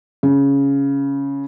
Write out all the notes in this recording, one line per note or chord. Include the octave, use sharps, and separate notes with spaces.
C#3